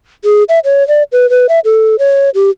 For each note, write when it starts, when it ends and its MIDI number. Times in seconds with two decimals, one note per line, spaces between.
0.25 0.43 68
0.49 0.59 76
0.65 0.86 73
0.88 1.03 74
1.12 1.29 71
1.30 1.46 71
1.49 1.60 76
1.65 1.95 69
1.99 2.30 73
2.35 2.50 67